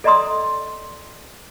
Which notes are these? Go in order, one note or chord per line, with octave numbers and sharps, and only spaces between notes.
A4 D5 D#5 A#5 C6 D#6